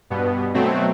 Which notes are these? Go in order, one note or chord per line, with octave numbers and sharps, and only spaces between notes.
G2 B2 B3
B2 F#3 A3 C4